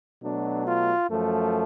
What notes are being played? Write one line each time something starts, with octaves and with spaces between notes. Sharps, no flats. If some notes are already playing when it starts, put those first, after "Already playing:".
B2 F#3 A3 D4
F4
F#2 F3 A3